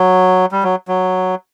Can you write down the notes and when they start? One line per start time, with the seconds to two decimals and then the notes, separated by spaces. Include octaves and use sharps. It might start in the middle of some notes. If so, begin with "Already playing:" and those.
Already playing: F#3
0.52 G3
0.64 F#3
0.88 F#3